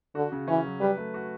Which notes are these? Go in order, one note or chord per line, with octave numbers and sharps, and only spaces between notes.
D3 F#4
C#3
E3 C#4
F#3
G3 B4
A3
F#4